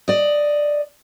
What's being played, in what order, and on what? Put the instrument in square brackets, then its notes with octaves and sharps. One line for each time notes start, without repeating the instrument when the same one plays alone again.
[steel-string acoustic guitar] D5 D#5